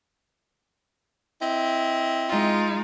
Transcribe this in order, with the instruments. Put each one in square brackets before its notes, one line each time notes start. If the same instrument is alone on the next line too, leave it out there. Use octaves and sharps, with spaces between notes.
[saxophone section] C4 E4 D#5
[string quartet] G#3 D#4 F4